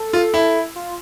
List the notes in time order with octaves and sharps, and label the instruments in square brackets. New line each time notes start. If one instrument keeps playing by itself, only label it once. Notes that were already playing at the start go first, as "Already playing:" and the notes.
Already playing: [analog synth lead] A4
[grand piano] F4
E4
[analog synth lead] F4